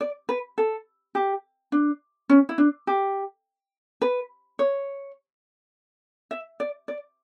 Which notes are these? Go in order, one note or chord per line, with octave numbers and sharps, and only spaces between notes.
D5
B4
A4
G4
D4
C#4
E4
D4
G4
B4
C#5
E5
D5
D5